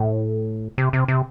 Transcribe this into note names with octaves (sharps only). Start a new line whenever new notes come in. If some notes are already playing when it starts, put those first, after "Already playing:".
Already playing: A2
C3
C3
C3